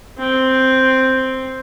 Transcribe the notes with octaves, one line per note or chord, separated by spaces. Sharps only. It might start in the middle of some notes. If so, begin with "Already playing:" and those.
C4